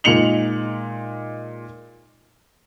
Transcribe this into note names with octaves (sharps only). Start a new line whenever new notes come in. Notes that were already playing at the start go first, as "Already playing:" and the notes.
A#2 G#3 D#4 C#7 F7 F#7